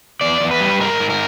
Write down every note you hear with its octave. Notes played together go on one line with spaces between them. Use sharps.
E2 D5
E2
B4
G3
G#2 A#4
G#2
A#4